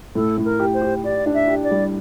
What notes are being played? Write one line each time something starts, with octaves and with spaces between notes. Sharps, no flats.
A2 A4
A2
A#4
G4
C5
G4
G4 D5
D4
E5
G4
D5
G3